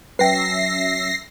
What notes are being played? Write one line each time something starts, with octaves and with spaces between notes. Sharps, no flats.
F#3 C#4 B4 E5 G5 A#6 C7